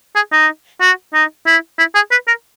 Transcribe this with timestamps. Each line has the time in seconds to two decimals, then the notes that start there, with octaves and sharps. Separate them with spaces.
0.15 G#4
0.32 D#4
0.81 F#4
1.14 D#4
1.46 E4
1.78 E4
1.95 G#4
2.11 B4
2.27 A#4